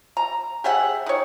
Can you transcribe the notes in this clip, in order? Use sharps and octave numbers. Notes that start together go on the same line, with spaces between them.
A#5
G4 G#4 E5 F#5
D#4 C#5